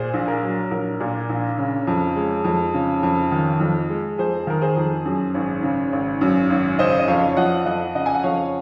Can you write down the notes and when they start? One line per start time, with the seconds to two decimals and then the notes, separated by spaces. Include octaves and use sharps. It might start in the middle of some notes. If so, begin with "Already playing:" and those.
Already playing: A#2 G#4 C5
0.13 A#1
0.28 A#4
0.42 F#3
0.71 A#1 A#4
1.00 A#2
1.29 A#1
1.58 C#3
1.87 F2
2.16 G#3
2.44 F2
2.74 C#3
3.03 F2
3.32 D#3
3.60 F2
3.89 G#3
4.18 F2 G#4 C5
4.47 D#3 A#4
4.61 G#4 C5
4.76 F2
5.05 F#2
5.34 G#1
5.63 C#3
5.92 G#1
6.21 F#2
6.50 G#1
6.79 C#3 C5 D#5
6.99 D#5
7.08 F2 C#5 F5
7.37 F3 D#5 F#5
7.66 F2 D#5 F#5
7.95 C#3 D#5 F#5
8.06 G#5
8.15 F#5
8.23 F2 C#5 F5